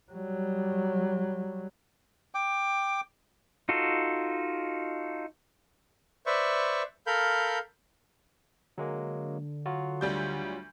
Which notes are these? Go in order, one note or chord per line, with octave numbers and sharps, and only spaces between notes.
F#3 G3
G5 D6
D#4 F4 F#4 A4
B4 C5 D5 E5 C#6
A4 A#4 F5 B5 G6
D3 F#3 G#3 A#3
F#3 F4 F#4
D2 G3 G6